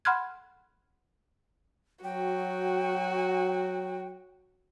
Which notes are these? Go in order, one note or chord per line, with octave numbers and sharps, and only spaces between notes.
F#5 B5 C6 F6 F#6 G#6
F#3 F#4 G5